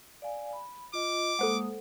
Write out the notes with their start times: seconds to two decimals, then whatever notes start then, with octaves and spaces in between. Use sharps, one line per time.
0.22 D5 F5 G#5
0.53 B5
0.94 F4 D#5 D6
1.39 G#3 A#3 A4 C5 F#5 D#6